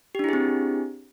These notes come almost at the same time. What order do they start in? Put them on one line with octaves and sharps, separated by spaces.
G4 D4 E4 G#4 C4